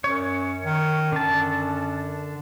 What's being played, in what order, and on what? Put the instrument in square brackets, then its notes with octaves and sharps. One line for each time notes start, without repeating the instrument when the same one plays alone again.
[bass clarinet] F#2 [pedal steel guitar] C#5
[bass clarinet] D#3
[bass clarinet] F#2 [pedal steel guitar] D3 A5